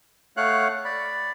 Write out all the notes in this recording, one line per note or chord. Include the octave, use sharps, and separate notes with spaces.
A3 C#5 F5 F#5 F#6
D5 B5